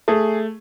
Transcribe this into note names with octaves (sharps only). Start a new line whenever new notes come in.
A3 G#4